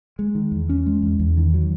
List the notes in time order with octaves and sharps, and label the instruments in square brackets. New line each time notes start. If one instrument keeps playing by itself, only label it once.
[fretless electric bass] G#3
D#3
E2
C#4
G#3
E2
E2
D#3
F#3